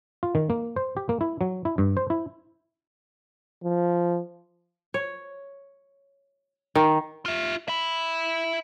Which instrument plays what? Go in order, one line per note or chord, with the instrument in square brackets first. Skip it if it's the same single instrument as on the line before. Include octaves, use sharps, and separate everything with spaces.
[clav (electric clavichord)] F4
D#3
A#3
C5
G4
A#3
E4
F#3
E4
G2
C5
E4
[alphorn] F3
[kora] C#5
D#3
[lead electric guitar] F4 E5
E5 B5